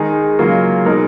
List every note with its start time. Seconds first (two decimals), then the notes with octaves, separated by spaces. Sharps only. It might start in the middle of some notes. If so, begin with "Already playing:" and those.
Already playing: D#3 G#3 D#4 G#4
0.39 C#3 F#3 A#3 F4
0.85 B2 G#3 D#4 A#4